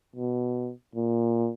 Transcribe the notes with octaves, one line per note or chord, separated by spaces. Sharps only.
B2
A#2